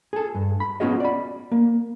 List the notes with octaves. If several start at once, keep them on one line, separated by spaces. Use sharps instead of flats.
G#4 A4
G2
B5
B3 C#4 F4 F#4 G#4 D#5
D5 B5
A#3